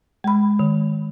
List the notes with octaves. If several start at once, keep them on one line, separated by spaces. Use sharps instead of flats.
G#3 B5
D#3